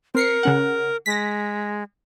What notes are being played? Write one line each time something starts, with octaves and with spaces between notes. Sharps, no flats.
C4 A#4 C7 C#7
C#3 C#4 F#5
G#3 A#6 B6